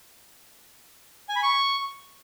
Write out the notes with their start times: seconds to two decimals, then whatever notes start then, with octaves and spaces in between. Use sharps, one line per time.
1.29 G#5
1.36 B5
1.43 C#6